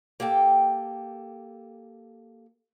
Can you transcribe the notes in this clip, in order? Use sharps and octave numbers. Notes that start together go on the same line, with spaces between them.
A#3 G4 A4 G5